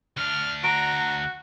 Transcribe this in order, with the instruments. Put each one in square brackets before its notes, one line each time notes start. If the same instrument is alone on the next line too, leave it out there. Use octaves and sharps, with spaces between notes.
[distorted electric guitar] D2 D4 [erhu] F6
[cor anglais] F#4 [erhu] A#5 [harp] D7